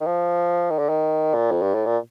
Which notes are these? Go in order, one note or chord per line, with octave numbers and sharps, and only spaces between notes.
D#3
F3
D#3
D3
D#3
A#2
F2
G2
A2
A#2